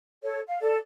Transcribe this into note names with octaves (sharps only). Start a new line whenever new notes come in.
A4 C#5
F5
A4 D5